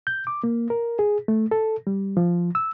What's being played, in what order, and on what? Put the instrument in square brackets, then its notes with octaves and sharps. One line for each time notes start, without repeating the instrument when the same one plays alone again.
[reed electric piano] G6
D6
A#3
A#4
G#4
A3
A4
G3
F3
E6